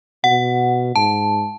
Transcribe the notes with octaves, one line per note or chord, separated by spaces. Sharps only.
B2 F#5
G#2 A5